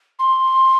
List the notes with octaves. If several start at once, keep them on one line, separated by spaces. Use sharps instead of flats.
C6